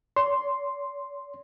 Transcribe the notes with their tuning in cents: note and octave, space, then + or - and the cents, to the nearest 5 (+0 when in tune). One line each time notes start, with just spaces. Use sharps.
C#5 +45 C6 +0